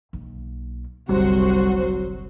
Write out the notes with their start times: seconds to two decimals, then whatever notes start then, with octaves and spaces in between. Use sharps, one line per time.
0.13 B1 A#3
1.09 F#1 C2 D3 F#3 G3 F#4 C5